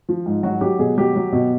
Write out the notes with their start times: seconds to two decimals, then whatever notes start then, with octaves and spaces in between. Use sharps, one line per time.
0.09 F3
0.26 G#2
0.43 F#3 F#4
0.61 F#3 G4
0.79 B2 G#4
0.98 F#3 G4
1.16 F#3
1.32 B2